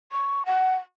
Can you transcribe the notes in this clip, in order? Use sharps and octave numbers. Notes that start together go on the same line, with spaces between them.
C#6
F#5